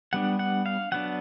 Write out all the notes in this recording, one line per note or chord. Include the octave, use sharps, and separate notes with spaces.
G3 B3 D4 F#5
F#5
F5
F#3 B3 D4 F#5